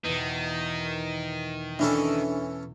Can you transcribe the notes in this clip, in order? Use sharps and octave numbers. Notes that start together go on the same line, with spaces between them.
E2 B2 D#3
E3 C#4 D4 A4